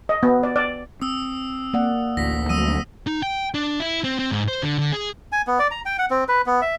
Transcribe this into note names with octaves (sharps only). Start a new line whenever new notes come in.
D#5
B3
D5
D5
C4 D#6 E6
A#3 D5 F#5
A1 D2 A#6 B6
E3 F#3 G3 A3 C4 D#6 E6 D#7
D#4
G5
D4
E4
C4
C4
G#2
C5
D3
D3
G#4
G#5
B3
D5
A#5
G5
F#5
C4
B4
B3
E5